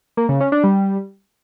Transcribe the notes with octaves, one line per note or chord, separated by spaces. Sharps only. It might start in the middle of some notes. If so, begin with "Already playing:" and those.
A#3
C#3
C#4
D4
G3